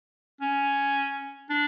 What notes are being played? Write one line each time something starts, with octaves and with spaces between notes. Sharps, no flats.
C#4
D4